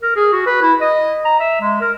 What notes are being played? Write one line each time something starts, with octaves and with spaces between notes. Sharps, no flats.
A#4
G#4
F#4
B4
E4
D#5
A#5
E5
G#3
A#4